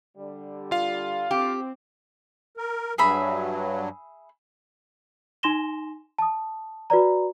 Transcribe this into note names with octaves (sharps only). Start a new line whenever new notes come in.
D3 G3
F4 F5
C4 G4
A#4
G2 F#3 G#4 E5 B5
D#4 G#5 C6 A#6 E7 G7
A5 D#6
F#4 B4 D5 A#5